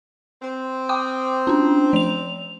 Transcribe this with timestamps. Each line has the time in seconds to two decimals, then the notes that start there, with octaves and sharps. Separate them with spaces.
0.42 C4
0.89 G5 D6 D#6
1.47 C#4 D4
1.93 F3 F7